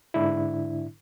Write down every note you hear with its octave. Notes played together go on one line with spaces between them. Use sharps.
G#2 D3 D4 E4